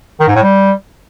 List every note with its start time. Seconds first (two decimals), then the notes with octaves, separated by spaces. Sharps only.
0.20 D#3
0.28 G#2
0.35 A2
0.43 G3